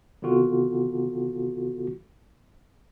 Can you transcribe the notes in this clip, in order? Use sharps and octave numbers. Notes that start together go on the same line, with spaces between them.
C3 D#3 B3 F4 F#4 A4